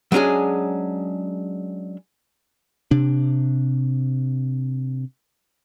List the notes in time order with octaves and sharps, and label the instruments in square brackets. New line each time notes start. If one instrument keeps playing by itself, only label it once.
[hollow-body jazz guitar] F#3 G#3 C#4 D4 G#4
[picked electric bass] C3 D4